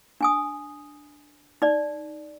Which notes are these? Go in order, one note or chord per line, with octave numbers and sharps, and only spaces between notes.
D4 G#5 D#6
D#4 D5